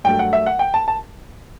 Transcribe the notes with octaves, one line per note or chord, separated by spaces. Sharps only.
G2 F#3 A3 G5
F#5
E5
F#5
G5
A5
A5